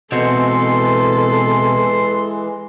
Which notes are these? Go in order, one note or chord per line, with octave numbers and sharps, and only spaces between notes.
B2 E3 G#3 C4 F#4 A4 C6